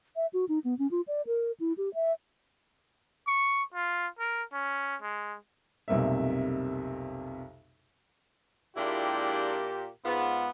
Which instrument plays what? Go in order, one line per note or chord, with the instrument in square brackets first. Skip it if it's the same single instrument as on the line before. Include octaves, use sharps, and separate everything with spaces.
[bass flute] E5
F#4
D#4
B3
C#4
F4
D5
A#4
E4
G4
E5
[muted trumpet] C#6
F4
A#4
C#4
G#3
[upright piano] B1 F2 C3 G3 A#3 E5
[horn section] A#2 G4 [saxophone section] G#3 D4 E4
[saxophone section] G#2 F4 [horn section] B3